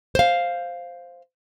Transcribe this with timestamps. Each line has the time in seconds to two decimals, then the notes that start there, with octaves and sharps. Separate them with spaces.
0.15 C5 F5